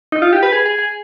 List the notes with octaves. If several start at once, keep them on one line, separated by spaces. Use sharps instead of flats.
D#4
F4
G4
B4
G#4
G#4
G#4